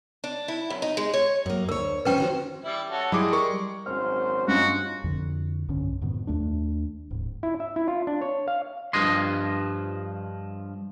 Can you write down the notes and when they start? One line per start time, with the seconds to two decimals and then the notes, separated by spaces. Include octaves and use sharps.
0.24 D4
0.48 E4
0.70 F#2
0.82 D#4
0.97 G#3
1.14 C#5
1.46 F#2 A#3
1.69 D2 A#4 C#5
2.05 F3 C#4 B4 C5 G5
2.18 D#3 C4 F#4
2.64 G3 E4
2.89 C#4 F#4 A4
3.12 G3 G#3 E4 G#4 D6
3.33 A#4 C#6
3.86 G#1 F#2 C5 F6
4.48 G2 C#4 D#4 F4 F#4
5.04 F2 D3
5.68 B1 G2 D3 C#4
6.01 F2 G#2 B2 D#3
6.27 D#2 A3 D4
7.11 D1 G#2
7.43 E4
7.60 E5
7.76 E4
7.88 F4
8.07 D4
8.22 C#5
8.48 F5
8.93 G2 F3 D#5 C6